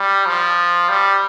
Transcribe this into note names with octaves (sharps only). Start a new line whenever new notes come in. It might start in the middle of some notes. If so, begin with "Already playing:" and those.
Already playing: G3
F3
G3